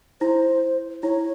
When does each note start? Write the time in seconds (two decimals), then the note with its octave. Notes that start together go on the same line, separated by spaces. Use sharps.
0.21 E4 C5
1.03 E4 C#5